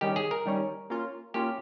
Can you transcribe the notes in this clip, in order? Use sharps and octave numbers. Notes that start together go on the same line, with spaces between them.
D#3 G3 C#4 G4
G#4
A#4
D#3 G3 C#4
A#3 C#4 F4
A#3 C#4 F4 G4